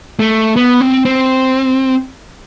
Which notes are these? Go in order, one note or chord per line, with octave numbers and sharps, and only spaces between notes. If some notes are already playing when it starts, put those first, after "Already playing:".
A3
B3
C4
C4